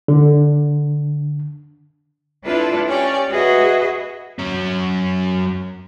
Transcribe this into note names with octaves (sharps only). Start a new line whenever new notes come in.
D3
D4 E4 F4 A4 B4
C#4 G4 D5
F#4 G#4 B4 D#5 E5
F#3 C#4